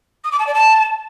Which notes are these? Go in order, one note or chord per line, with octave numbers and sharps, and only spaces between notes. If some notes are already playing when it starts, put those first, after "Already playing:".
D#6
D6
A5
D5
A5